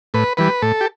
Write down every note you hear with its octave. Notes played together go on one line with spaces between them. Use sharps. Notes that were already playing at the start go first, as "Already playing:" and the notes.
A2 B4
E3 G3 B4
A2 A4
G4